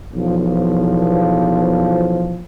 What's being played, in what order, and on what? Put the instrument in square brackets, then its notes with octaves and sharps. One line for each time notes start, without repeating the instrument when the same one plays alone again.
[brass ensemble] B1 E2 F3